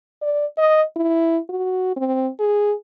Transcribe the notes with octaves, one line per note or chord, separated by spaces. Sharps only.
D5
D#5
E4
F#4
C4
G#4